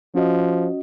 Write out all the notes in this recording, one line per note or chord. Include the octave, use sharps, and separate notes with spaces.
F3 C#4 F#4 D#5